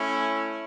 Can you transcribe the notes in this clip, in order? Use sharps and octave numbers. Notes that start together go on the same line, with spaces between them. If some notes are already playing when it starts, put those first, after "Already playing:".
Already playing: A3 C#4 E4